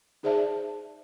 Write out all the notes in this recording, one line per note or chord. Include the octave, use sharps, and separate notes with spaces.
D#4 G#4 C5 D5 E5 A5